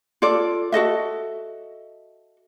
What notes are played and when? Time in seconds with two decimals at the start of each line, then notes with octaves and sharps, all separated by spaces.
0.22 F4 A4 D5
0.72 F#4 A4 D#5 E5